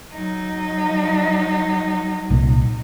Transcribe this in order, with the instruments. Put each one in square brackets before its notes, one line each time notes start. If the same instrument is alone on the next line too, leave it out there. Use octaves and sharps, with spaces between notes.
[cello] F#3 D#4
[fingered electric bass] C2 A#2